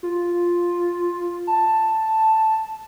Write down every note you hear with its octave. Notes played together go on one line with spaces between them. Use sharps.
F4
A5